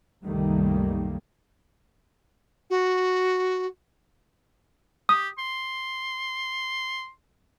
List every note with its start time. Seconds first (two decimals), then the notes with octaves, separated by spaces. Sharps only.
0.24 C2 F#2 D#3 G3 A3 A#3
2.70 F#4
5.09 G4 D#6
5.38 C6